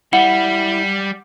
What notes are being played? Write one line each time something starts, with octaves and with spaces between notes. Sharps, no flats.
G3 E4 F#5